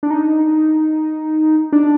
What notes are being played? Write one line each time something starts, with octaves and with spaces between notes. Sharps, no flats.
D4
D#4
D4